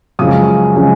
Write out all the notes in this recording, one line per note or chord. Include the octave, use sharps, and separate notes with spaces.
F#2 C#3 F3 G#3 C#4 D#6
C#3 F3 G#3 C#4